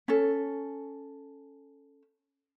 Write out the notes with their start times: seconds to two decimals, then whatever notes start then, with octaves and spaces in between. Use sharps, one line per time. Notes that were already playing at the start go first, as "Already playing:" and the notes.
0.08 C#4 A4